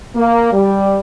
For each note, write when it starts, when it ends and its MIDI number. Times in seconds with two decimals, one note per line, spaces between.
0.16 0.50 58
0.53 0.99 55